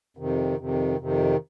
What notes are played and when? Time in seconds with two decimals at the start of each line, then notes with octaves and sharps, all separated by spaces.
0.17 F2 C3 D#3
0.57 F2 C3 D#3
0.98 F2 C3 D#3